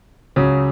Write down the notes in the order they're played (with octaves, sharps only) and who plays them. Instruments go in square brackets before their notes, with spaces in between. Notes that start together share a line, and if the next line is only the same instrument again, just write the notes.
[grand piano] C#2 C#3 F#3 C#4